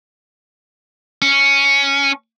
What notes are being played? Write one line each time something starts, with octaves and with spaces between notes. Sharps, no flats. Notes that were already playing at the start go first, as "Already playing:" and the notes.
C#4